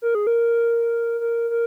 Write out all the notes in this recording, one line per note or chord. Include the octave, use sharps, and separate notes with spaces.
A#4
G#4
A#4
A#4
A#4